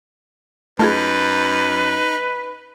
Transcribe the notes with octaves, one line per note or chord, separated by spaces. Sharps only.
F#2 A3 D#4 F4 G#4 B4 D#5